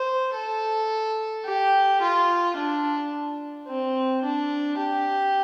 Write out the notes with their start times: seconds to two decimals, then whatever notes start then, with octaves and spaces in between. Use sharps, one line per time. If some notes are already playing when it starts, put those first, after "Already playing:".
Already playing: C5
0.35 A4
1.45 G4
2.01 F4
2.56 D4
3.68 C4
4.23 D4
4.79 G4